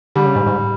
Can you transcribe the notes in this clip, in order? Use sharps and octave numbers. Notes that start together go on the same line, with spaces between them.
D3 G3
C#3
G#2
G#2